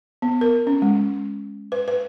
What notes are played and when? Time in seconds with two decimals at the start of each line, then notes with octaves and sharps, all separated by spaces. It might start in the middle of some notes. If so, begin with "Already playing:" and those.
0.22 B3
0.41 A#4
0.67 C#4
0.82 G#3
1.72 B4
1.88 B4